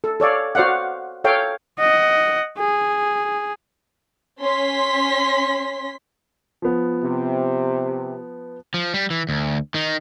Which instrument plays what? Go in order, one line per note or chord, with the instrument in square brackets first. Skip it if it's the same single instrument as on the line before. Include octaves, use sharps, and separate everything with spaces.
[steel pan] A4
A4 C#5 D5 F5
F#4 C5 D5 F5 F#5
A4 C#5 F5 G5
[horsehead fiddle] D#5 F#5
G#4
[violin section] C#4 C6 B6
[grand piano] F3 B3
[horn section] C3
[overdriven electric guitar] F3
G3
E3
D2
D#3 D#4